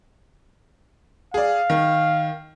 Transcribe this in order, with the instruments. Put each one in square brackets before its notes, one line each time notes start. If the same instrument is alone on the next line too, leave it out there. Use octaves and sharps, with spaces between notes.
[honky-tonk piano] G#4 D5 [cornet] F5
[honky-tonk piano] D#3